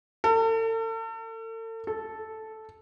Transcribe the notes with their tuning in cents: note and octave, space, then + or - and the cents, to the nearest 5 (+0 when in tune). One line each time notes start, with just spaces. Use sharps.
A4 +40
A4 -5